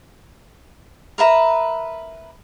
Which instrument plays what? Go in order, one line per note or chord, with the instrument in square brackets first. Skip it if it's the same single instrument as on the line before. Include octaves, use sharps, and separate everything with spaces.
[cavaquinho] A#4 B4 E5 A#5